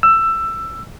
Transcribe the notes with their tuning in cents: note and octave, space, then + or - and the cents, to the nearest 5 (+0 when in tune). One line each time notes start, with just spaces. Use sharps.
E6 +15